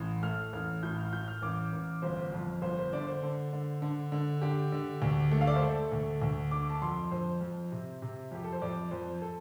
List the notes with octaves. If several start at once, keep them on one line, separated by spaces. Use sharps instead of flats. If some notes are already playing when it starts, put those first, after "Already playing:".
Already playing: A1 A2
A3 F6
A1 F6
A2 G6
F6
A2 G6
F6
A1 D6
A1
G1 C5
F2
G1 C5
C5
D3 D5
C5
D3
D3
D3
D3
D3 G4
D3
D2
A3
F5
D5
C5
A3 A4
D2
D2
D3 D6
A5
F2 C6
F2 C5
F2
C3
C3
F2 G4
A4
C5
F2 D5
F2 C5
A4